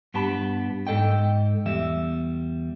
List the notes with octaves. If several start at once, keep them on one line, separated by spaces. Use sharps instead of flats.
G2 B3 G4 A5 B5
G#2 A4 D#5 G5
E2 G3 E5